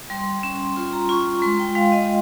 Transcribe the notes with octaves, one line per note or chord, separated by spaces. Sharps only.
G3 C6
C#4 C6
F4 C6
A#5
F4 C#6
G#3 C6
G5
G#3 F5
D#5